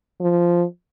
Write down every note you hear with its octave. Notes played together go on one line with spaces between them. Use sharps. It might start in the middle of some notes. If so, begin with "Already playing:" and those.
F3